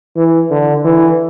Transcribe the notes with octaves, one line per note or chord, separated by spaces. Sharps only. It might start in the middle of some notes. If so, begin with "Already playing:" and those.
E3
D3
E3